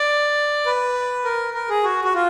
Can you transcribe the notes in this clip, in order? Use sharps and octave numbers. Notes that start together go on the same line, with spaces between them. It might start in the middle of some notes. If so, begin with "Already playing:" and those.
Already playing: D5
B4
A#4
A#4
G#4
F#4
F#4
F4